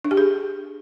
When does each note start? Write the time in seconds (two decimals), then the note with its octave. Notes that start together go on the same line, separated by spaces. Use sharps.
0.04 D4
0.11 G4
0.17 G#4